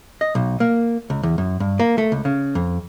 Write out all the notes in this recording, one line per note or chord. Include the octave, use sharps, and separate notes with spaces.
D#5
B1
A#3
C#2
E2
F#2
G2
A#3
A3
C#2
C#3
F2